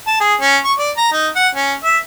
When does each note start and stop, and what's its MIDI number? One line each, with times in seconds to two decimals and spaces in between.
0.07 0.19 81
0.21 0.34 68
0.41 0.57 61
0.65 0.73 85
0.79 0.91 74
0.97 1.09 82
1.13 1.28 63
1.36 1.48 78
1.55 1.74 61
1.84 1.97 76